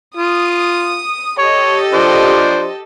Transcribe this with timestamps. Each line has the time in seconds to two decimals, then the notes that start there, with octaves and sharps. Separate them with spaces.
0.17 F4 D#6
1.39 G4 A4 C#5 D#5
1.93 F3 D4 C5